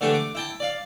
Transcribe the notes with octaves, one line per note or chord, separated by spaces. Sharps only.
D3 E3 A3 G4
D6
E4 G5 A5
D5 F5